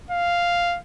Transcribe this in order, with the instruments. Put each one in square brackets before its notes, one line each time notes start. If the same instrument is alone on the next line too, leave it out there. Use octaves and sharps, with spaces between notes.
[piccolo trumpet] F5